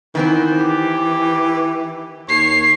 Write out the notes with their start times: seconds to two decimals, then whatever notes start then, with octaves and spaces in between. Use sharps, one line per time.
0.15 D#3 E3 B3 C4
0.60 G4
2.29 D#2 C#5 C7